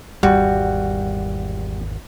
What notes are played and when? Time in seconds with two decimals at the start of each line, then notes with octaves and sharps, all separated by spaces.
0.23 G#1 E2 G3 F#4